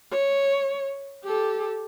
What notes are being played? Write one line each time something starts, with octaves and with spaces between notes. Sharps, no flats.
C#5
G4 A4